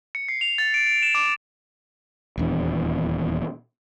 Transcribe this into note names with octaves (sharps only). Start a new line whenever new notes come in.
C#7
C7
F7
A6
D7
D7
E7
D6
D#1 E2 D4